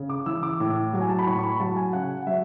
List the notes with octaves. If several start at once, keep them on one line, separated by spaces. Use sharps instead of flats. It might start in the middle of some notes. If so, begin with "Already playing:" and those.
Already playing: C#3
D6
E3 E6
D6
A2
F#3
G#5
A5
B5
A2 C#6
C#6
B5
F#3 A5
G#5
C#3 F#5
F#3 E5